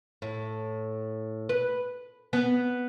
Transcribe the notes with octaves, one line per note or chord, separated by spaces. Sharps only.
A2
B4
B3